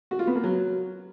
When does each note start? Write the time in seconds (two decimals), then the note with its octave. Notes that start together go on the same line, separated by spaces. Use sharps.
0.11 F#4
0.19 F4
0.27 B3
0.35 A#3
0.44 F#3